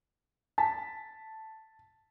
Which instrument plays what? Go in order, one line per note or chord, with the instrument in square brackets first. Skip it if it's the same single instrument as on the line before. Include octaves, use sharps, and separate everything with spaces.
[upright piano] A5 B6